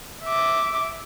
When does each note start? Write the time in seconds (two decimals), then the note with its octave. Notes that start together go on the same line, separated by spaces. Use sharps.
0.24 E5 D6